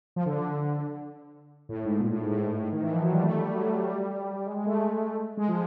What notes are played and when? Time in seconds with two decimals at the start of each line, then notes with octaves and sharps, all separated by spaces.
0.16 F3
0.26 D3
0.37 D3
1.69 A2
1.85 G#2
2.00 A#2
2.10 A2
2.20 G#2
2.31 A2
2.61 A2
2.72 D#3
2.82 E3
2.92 F3
3.02 F#3
3.12 G3
3.23 A3
3.38 G3
3.53 F#3
3.84 G3
4.46 G#3
4.56 G#3
4.66 A3
5.37 G#3
5.48 F3